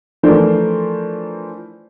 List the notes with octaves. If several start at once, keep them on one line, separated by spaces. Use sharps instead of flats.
E3 F3 A3 D4 A#4 C5